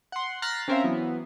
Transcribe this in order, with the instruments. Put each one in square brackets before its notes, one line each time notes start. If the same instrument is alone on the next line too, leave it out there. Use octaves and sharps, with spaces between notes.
[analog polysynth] F#5 C6
A#5 F6 F#6 A6 B6 C7
C4 C#4 A#4 C5 E5 F5
E3 F#3 B3